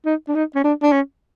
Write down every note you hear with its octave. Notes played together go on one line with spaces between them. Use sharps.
D#4
D4
D#4
C#4
D4
D4
C#4